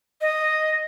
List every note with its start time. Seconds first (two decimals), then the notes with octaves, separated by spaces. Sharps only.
0.21 D#5